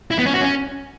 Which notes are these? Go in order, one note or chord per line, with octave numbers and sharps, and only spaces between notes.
E4
B3
C#4
F#4
C#4